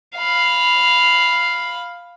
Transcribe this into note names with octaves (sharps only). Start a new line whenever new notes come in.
F5 B5